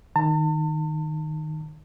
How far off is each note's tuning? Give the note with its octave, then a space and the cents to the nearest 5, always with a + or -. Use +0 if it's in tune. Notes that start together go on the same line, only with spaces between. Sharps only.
D#3 -5 A5 +40